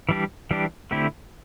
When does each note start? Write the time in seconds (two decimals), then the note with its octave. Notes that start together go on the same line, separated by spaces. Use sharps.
0.09 E3 G3 D4 G4
0.51 E3 G3 D4 G4
0.91 D3 A3 C4 E4 G4